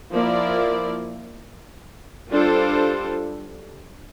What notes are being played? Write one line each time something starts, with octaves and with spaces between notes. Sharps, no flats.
F3 A#3 E4 A#4 D5
G3 D4 F4 A4 C5